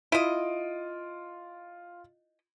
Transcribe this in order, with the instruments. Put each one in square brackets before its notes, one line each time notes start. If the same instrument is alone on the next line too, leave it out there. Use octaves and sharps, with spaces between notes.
[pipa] E4 D#5 [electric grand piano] F4 D7 D#7